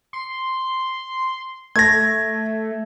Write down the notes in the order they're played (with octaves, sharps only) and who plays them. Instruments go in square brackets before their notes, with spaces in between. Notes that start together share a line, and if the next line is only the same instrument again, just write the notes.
[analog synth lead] C6
[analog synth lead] A3 [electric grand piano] G#6 A#6